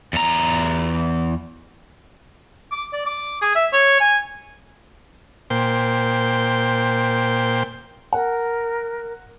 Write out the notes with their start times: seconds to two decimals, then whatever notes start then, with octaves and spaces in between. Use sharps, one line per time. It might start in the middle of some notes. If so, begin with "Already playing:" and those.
0.13 E2 A#5
2.72 D6
2.93 D5
3.06 D6
3.42 G#4
3.55 E5
3.73 C#5
4.00 G#5
5.50 A#2 C5 G5
8.13 A#4 F#5